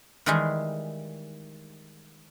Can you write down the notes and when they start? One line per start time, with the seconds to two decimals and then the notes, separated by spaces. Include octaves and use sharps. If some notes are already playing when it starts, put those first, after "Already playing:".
0.26 D#3 E3 G3 G#3 D#4 G#4